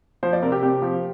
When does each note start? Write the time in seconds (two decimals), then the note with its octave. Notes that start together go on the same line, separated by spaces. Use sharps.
0.23 F3 C5
0.33 D5
0.42 C3 A#4
0.52 G4
0.62 C3 G4
0.82 F3